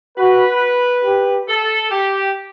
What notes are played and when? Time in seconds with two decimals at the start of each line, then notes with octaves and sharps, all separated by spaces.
0.18 F#4 B4
1.05 G4
1.48 A4
1.91 G4